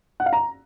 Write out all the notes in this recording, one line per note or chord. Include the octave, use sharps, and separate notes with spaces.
F#5
F5
A#5